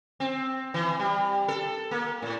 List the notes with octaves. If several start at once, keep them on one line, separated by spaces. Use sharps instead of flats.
C4
E3
G3
A4
A#3
A2